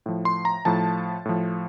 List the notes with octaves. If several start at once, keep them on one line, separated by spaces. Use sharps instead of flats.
A2 F3
C6
A#5
A2 F3 A5
A2 F3